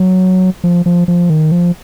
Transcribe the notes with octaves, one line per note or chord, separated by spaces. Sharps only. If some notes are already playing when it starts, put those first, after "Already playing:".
Already playing: F#3
F3
F3
F3
D#3
F3